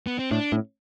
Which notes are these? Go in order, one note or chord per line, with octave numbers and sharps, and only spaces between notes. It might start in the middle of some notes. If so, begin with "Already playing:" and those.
B3
C4
A2 D4
A2